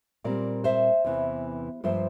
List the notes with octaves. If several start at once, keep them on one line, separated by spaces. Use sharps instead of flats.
A#2 G3 C4 A#4 D5
C5 E5
E2 C3 E3
G2 F3 A#3 C5 E5